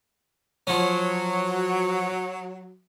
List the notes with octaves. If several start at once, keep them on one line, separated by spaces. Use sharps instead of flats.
F3 F#3 C#4